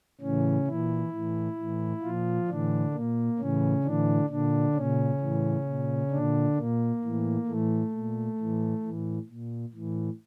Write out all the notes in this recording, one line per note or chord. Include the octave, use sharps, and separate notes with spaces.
A2 C#3 E3 C#4
A#2 E3 E4
A2 E3
A2 E3
A#2 F3 F4
A2 D3 E3 D4
A#2 A#3
A2 C#3 E3 C#4
A2 D3 E3 D4
A#2 D3 D4
A#2 C#3 C#4
A2 E3
A#2
A#2 D3 D4
A#2 A#3
A2 E3
A2 E3 A3
A#2
A2 E3
A2 E3
A#2
A2 E3